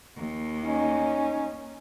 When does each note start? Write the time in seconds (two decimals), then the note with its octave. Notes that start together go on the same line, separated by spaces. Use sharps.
0.17 D#2
0.65 C#4 D#4